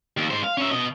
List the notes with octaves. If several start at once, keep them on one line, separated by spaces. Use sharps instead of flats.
D#2
G#2 C5
F5
C#4 E5
B2 D#5